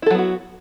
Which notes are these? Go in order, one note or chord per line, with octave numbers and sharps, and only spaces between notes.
F#3 B3 E4 F#4 A4